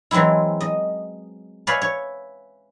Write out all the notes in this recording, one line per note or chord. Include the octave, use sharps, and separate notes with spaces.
E3 F#3 G#3 C4 E4
D#5
B4 C#5 D5 E5 F5 G#5
C#5